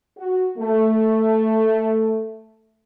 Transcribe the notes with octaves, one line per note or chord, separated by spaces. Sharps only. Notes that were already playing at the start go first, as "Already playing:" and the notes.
F#4
A3